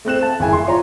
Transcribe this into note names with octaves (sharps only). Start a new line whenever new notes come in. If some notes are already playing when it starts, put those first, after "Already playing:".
A3 C4 F#6 E7
A5
G1 F#2 C#3 E4 G#5
C6
F4 C#5 A#5